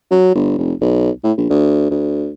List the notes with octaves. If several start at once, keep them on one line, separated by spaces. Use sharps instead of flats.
F#3
G1
F1
B1
A2
A#1
D2
D2